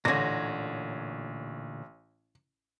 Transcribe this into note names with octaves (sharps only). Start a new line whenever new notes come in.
A1 A#2 D3 C#5 G#6 A#6